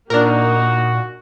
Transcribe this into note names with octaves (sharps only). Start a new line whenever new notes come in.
A#2 A#3 D4 D#4 F#4 A#4